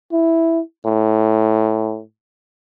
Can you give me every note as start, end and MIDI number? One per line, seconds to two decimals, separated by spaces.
0.12 0.60 64
0.85 2.00 45